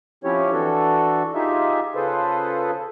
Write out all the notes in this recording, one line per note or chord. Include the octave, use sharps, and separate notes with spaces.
F3 C4 C#4 E4 G4 C#5
E3 D4 F#4 A4
D#4 F4 G4 G#4 E5
C#3 F4 G#4 A4 B4 C5